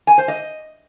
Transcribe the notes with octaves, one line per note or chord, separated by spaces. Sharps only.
G#5
C5
D#5